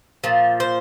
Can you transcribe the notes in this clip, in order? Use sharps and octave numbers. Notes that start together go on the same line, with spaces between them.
A#2 F3
C5